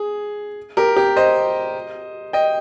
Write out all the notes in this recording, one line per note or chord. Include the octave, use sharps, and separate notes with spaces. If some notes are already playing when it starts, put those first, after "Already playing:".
Already playing: G#4
G4 A#4
G4
C5 D#5
D#5 G5